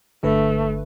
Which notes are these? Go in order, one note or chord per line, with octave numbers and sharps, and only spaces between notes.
G1 D3 A3 B4